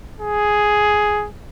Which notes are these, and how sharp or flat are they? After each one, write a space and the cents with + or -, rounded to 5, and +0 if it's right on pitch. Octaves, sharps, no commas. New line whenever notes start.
G#4 +5